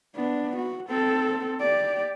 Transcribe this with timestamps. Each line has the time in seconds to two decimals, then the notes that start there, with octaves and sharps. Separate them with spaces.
0.15 B3 D4
0.56 F#4
0.89 C4 A4
1.60 G4 D5